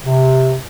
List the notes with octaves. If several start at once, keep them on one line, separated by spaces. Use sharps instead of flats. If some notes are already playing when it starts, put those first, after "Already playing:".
C3